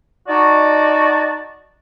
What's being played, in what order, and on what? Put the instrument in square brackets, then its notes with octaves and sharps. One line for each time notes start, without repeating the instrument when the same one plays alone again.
[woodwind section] D#4 F#4 D5 A5